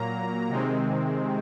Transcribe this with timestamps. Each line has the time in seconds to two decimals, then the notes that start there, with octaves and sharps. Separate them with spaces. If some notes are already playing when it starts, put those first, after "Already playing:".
Already playing: A#2 F#3 A#3 A#5
0.49 C3 D#3 G#3 C4